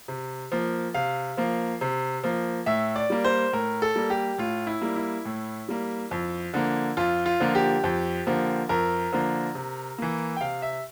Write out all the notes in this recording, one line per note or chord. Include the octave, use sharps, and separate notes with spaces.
C3
F3 A#3
C3 F5
F3 A#3
C3
F3 A#3
A2 E5
D5
G3 A#3
C5
A2 A#4
A4
G3 A#3
G4
A2 F4
E4
G3 A#3
E4
A2
G3 A#3
F2
D3 F3 A#3
F2 F4
F4
D3 F3 A#3
G4
F2
D3 F3 A#3
F2 A#4
D3 F3 A#3
C3
E3 A#3
G5
C3 F5
E5